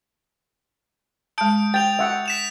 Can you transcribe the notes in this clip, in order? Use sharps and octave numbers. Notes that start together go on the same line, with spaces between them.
G#3 A5 D#6 G6 D7
G5 A6 F7
E5 F#5
B6 E7 F7